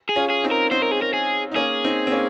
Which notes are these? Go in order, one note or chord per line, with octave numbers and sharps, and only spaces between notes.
G#4
C#4 F4
G#4
C4 D#4
A#4
C4 D#4 C5
A#4
G#4
A#4
G#4
D#4
A#3 C#4 G#4
C4 D#4
C4
A#3 C#4